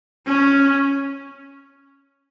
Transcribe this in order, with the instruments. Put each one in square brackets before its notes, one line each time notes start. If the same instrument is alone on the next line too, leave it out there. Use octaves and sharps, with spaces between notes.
[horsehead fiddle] C#4